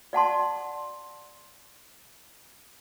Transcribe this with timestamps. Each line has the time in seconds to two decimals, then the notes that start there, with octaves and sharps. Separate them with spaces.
0.13 D5 F#5 A5 C6